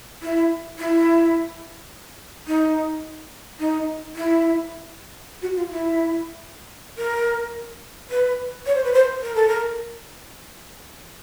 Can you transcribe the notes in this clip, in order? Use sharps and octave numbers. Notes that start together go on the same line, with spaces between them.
E4
E4
D#4
D#4
E4
F#4
F4
E4
A#4
B4
C#5
C5
B4
C5
A#4
A4
A#4